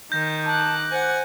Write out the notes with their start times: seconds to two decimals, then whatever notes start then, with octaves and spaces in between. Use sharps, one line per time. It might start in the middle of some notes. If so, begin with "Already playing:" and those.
0.12 D#3 G6 A#6
0.46 A5 D6 F#6
0.91 C5 F#5 G#5